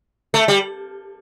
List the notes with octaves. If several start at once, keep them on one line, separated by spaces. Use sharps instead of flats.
A3
G3